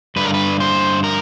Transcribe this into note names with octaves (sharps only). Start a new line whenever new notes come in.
G2 D3 B4
A#4
B4
C5
A#4